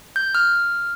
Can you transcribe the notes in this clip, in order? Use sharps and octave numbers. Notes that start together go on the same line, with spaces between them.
G6
F6